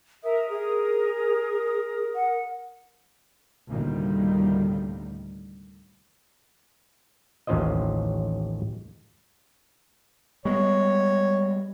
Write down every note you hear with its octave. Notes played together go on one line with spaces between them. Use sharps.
A#4 E5 D#6
G#4
F#5
D2 A2 C3 D#3 G3 A#3
A1 D#2 C#4 F4 C5 D#5
G3 G#3 B3 C#5